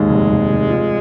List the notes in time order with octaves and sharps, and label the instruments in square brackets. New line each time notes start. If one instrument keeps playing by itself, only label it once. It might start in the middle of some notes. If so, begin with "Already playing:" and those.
Already playing: [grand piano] D#2 G#2 [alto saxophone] G#3
[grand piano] F1
F1
F1
F4